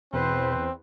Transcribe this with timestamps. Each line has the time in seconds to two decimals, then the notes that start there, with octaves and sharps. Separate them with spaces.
0.13 E2 B2 C4 B4 C5